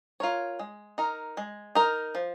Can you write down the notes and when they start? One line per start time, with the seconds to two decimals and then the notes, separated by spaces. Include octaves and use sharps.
0.20 F4 A#4 C#5
0.59 G#3
0.98 D#4 A#4
1.37 G#3
1.75 D#4 A#4
2.15 F3